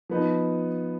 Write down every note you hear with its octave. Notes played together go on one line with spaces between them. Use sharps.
F3 B3 D#4